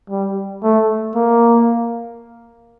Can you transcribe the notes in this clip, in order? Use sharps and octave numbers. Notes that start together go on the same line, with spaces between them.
G3
A3
A#3